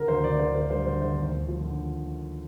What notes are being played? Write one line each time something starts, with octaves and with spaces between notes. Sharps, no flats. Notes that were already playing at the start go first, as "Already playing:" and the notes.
Already playing: D3 A#4
D2 C5
D2 D5
D2 C5
D3 C5
G3 C5
D3 C5
D2 C5
D#2
D#2
F3
D3